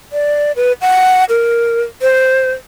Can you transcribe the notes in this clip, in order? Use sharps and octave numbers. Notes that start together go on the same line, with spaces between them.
D5
B4
F#5
A#4
C5